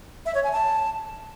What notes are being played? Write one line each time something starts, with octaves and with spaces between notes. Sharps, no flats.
E5
C#5
G#5
A5